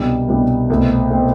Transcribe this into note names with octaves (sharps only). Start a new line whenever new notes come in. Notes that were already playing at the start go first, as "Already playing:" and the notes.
Already playing: C2 B2 G3 D4
C2 B2 G3 D4
C2 B2 A3 C4
B2 A3 C4